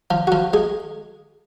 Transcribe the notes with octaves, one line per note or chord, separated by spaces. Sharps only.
F3 F4
F#4
F3 F4
G#3 G#4